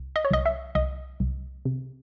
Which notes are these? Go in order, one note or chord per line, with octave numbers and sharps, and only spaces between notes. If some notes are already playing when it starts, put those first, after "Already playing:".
Already playing: C2
D#5
C#5
C2 D#5
E5
C2 D#5
C2
C3